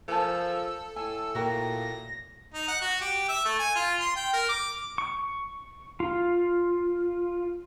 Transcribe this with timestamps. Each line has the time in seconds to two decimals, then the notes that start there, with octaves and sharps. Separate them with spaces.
0.08 F3 A4 A#4 G#5 A5 E6
0.96 A2 G#5 E6
1.35 A#2 F#4 A#4 G5 A#6
2.54 D#4
2.68 F#5
2.81 F#4
3.01 G4
3.28 E5
3.45 A3
3.59 G#5
3.75 F4
4.00 C6
4.16 G5
4.33 A#4
4.49 D6
4.98 C#6
6.00 F4